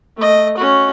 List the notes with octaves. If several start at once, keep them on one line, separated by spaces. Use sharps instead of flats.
A3 D#5
C#4 F#4